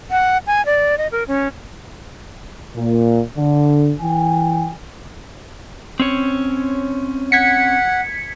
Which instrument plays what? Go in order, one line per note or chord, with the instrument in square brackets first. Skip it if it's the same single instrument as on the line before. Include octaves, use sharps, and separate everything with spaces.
[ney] F#5
G#5
D5
D#5
A#4
C#4
[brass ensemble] A#2
D3
E3 G5 G#5
[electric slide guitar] C4 C#4 C#5
[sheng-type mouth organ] F#5 [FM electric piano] G#6 B6 C#7